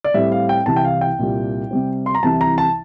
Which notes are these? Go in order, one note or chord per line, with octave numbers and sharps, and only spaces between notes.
D5
A2 G3 C4 E5
F5
G5
C2 C3 E3 A5
G5
F5
G5
C2 A#2 G3
C3 G3 C4
C6
A#5
C2 C3 E3 A5
A#5
A5